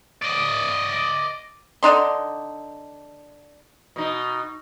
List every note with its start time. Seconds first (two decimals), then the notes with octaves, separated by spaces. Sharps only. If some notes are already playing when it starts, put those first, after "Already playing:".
0.23 D5 D#5
1.83 D3 D4 D#4 C6
3.96 B2 D#4